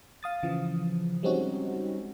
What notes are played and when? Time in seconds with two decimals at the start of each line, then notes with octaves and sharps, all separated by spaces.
0.23 F5 D#6 A6
0.43 C#3 E3 F3
1.23 G3 G#3 C4 C#4 D#4 F#4